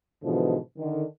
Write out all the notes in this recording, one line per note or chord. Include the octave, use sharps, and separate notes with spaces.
G#2 B2 D3 E3 F3
D3 D#3